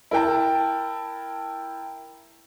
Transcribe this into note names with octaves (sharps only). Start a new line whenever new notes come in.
E4 A#4 G5 A5